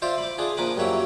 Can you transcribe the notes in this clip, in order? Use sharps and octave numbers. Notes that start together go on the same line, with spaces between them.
F4 C5 D5 E5 F5
B5 D6
D4 F4 G#4
A#1 F3 A#4 B4 B5 D6
F#2 G3 A#3 C#5 E5